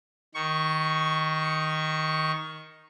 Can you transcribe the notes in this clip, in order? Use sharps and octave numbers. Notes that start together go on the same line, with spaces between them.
D#3 C#6